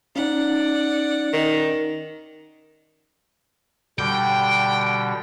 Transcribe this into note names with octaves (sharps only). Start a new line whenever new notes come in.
C#4 D#4 D5 F#5
D#3
B2 D3 G3 G5